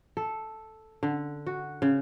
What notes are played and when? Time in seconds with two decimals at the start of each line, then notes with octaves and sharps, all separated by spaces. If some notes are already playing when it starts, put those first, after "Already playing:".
0.17 A4
1.03 D3
1.46 F#4
1.82 C#3